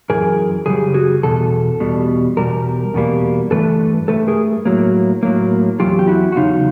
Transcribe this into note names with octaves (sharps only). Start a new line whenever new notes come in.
F#2 C#3 E3 G#4 A#4
F#2 C#3 G3 G#4
F#4 G#4
E2 B2 A4
E2 B2 G3
E2 B2 G3 A#4
E2 B2 G3 A#3
G2 E3 A3 A4 B4
G2 E3 A3 A4 B4
G#4 A#4
A2 F#3 A#3
A2 F#3 A#3
E2 C#3 F#3 F4 G4
G4
E4 F#4
F#4
E2 C#3 F#3 D#4 F4